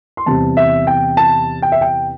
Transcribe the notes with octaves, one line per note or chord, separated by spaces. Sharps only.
C6
E2 C3 G3 C4 A5
E5
G5
A5
G5
E5
G5